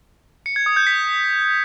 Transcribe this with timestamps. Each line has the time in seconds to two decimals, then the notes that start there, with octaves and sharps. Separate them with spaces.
0.46 C#7
0.56 G#6
0.66 D#6
0.76 G6
0.87 B6